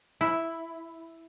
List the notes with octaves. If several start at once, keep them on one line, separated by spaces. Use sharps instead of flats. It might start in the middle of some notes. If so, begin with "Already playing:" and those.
E4